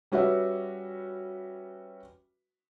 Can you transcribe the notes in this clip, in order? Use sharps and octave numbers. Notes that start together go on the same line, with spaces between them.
G3 C#4 F#4 B4 E5